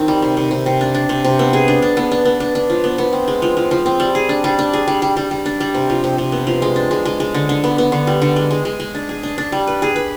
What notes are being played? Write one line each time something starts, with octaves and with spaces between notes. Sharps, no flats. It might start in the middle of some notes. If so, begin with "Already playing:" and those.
Already playing: D#3 C4 D#4
G3
C3
C3
C3
C3
D4
D4
C3
C3
B3
G#4
D4
D4
B3
D4
B3
D4
D4
F3
B3
B3
C4
G#3
F3
F3
F3
C4
G3
G#4
D4
G3
D4
G#4
G3
G3
G3
G3
D4
G3
C3
F3
C3
C3
B3
F3
G#3
D4
G#3
G#3
G#3
D3
D3
B3
B3
D3
G3
D3
G#3
G#3
G#3
G#3
D4
G#4
D4
D4
G3
B4
G#4
B4